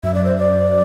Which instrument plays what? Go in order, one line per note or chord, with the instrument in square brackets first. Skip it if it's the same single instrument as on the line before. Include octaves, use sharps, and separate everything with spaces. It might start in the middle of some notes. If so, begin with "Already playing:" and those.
[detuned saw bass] F#2 [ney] E5
[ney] D5
C5
D5